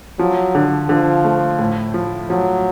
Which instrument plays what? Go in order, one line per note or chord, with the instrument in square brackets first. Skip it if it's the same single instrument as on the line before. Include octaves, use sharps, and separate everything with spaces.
[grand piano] F3 [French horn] F#3
[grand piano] D3
[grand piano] D3 [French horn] F3
[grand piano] A3
A2
F3
[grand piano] F3 [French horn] F#3